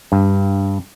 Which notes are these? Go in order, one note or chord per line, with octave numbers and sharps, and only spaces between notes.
G2